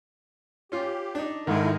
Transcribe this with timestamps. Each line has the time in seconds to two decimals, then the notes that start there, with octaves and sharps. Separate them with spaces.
0.72 C#4 F4 G4
1.15 D4 D#4
1.47 G#2 D#3 G#3 E4 A4 A#4